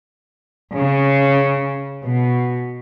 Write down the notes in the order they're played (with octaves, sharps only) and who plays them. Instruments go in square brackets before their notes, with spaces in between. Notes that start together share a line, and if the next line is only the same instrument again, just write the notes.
[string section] C#3
B2